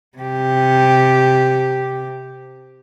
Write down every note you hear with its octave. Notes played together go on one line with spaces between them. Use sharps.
C3 G4